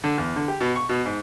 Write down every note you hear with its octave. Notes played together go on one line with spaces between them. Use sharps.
D3
E2
D3
G4
B2
C#6
B2
G#2